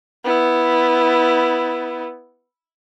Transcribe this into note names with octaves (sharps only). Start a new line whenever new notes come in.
B3 E4